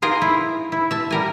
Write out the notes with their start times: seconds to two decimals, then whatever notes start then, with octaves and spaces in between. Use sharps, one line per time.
0.02 D#4 F4 G#4 A#4
0.22 E4
0.72 E4
0.91 E5 A5
1.11 G3 A#4 G#5